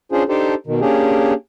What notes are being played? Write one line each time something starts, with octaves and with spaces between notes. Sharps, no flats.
C#4 D4 F4 G#4 C5
D4 D#4 G4 A4 C5
B2 D#3
A#3 C#4 D4 G4 G#4